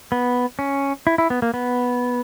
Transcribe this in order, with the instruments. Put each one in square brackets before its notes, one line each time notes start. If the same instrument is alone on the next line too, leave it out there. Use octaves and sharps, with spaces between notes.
[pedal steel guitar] B3
C#4
E4
E4
B3
A#3
B3